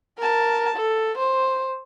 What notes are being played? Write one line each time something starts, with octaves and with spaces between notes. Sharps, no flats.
A#4 A5
A4
C5